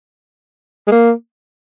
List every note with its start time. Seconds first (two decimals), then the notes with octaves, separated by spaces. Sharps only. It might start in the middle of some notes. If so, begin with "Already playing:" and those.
0.87 G#3
0.92 A#3